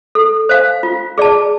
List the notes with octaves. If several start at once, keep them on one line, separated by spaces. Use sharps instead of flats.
A4
C5 F5 G#5
F4
G#4 D5 A5